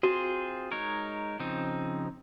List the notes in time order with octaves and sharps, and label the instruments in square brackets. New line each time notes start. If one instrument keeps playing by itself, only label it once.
[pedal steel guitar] C4 F4 G#4 C5 [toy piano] F#4
[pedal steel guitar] G#3 D#4 A#4 C#5
C#3 F3 C4 D#4